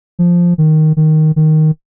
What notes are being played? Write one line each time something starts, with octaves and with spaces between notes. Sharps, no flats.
F3
D#3
D#3
D#3